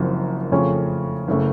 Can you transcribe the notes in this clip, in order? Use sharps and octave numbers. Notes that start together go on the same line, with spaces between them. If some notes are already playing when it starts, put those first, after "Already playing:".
Already playing: F#1 F#2 F3 C4
F2 C#3 A3 C#4 F4
F#1 C#3 A3